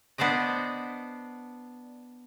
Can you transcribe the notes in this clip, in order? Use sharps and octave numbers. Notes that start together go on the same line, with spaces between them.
B3 D4 C5 D5 D#5